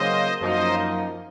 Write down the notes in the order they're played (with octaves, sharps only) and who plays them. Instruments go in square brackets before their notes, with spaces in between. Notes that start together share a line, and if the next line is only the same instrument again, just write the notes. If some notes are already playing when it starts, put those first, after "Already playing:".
Already playing: [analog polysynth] C#3 F#3 A#3 [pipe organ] C5 D#5
[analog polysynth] F#2 F3 A#3 D#4 [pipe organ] C5 D#5